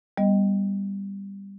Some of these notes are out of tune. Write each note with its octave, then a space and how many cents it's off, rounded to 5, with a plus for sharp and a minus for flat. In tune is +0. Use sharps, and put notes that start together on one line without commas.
G3 +10 B3 +0 D#5 +0